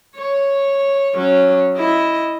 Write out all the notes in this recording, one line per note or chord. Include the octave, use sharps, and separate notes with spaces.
C#5
F#3 C#4
E4 D#5